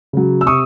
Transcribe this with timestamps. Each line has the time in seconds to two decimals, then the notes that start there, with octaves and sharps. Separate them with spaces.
0.13 C#3 F#3
0.41 E6
0.46 C3 C#6 D#6